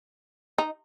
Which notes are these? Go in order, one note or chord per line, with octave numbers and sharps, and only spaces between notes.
D#4